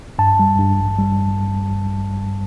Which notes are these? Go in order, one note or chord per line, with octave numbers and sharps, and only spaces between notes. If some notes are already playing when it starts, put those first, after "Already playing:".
G2 A5
G3
G2
A1
G3